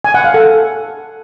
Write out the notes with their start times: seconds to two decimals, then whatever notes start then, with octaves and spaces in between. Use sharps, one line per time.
0.04 G#5
0.14 F#5
0.24 F5
0.34 A4